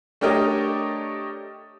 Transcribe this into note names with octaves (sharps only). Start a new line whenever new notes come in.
A3 D4 G4 A#4 C#5 D#5